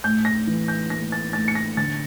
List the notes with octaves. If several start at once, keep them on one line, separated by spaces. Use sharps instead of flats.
A2 G6
A#6
E3
G6
A#3 A#6
A6
A2 A6
C#7
A#6
D3 A6